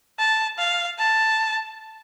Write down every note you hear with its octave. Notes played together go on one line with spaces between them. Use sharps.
A5
F5
A5